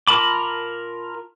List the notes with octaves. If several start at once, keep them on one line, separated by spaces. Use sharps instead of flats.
F4 A#4 A5 B5 D6